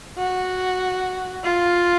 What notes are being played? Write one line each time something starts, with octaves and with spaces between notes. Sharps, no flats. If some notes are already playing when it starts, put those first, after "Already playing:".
F#4
F4